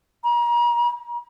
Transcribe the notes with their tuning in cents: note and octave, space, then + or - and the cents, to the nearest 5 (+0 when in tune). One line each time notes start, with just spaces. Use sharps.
A#5 +35